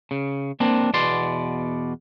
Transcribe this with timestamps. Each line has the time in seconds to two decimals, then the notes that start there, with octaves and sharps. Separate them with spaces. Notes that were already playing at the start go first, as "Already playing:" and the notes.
0.11 C#3
0.60 A#3 C4 D4
0.94 E2 B2 D5 C6